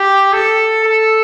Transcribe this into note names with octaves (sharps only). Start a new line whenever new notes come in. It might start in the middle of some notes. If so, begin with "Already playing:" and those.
Already playing: G4
A4
A4